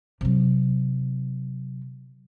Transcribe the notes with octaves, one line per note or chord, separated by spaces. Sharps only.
C3 F#3